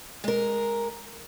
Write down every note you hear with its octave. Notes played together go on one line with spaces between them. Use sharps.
G#3 A#4